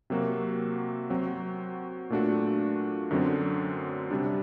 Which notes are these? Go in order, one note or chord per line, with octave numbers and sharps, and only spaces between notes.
C3 F#3 A#3 F#4
F#3 C4 F#4
A#2 A3 D4 F#4
F#2 D3 F#3 C4
C3 G3 D4